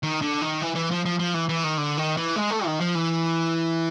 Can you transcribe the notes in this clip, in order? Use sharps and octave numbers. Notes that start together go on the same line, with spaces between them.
D#3
D3
D#3
E3
E3
F3
F3
F3
E3
E3
D#3
D3
D#3
E3
G#3
A3
D#3
F3
E3